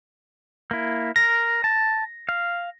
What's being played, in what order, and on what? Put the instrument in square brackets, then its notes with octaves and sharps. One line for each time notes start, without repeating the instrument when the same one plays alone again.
[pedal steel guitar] A#3 E4
[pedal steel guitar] A#4 [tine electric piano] A#6
[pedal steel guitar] A5
F5